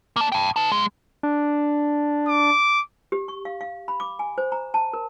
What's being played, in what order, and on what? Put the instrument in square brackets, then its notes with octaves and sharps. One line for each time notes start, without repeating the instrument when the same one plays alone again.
[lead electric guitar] A#3 A5
G5 A5
D#4 A5
B1 G#3
[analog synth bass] D4
[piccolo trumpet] D6
[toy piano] G4
C#6
F5
F5
B5
D6
G#5
C5
A#5
A5
A#4